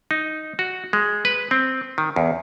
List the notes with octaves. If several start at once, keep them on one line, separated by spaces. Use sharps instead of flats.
D#4
F#4
G#3
B4
C4
D#3
E2